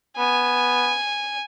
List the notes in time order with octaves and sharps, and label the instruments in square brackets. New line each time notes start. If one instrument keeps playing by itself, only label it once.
[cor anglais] B3 [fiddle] G#5